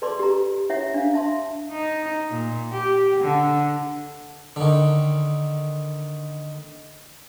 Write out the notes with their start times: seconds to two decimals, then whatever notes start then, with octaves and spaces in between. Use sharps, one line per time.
0.02 A4 B4 D5 A5 C6 D6
0.19 G4 A#5
0.70 E4 C#5 E5 F#5
0.94 D4 F5
1.14 E5 A5 C6
1.71 D#4
2.30 A#2
2.72 G4
3.21 D3
4.56 D3 D#3